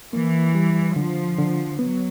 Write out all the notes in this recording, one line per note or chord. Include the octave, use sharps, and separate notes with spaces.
E3 A#3
G3
D3 F3
D3
F#3 B3